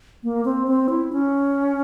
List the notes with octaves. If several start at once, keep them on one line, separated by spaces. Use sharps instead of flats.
A#3
C4
C4
E4
C#4